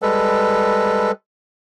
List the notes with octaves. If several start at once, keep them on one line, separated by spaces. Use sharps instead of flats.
G3 G#3 A4 B4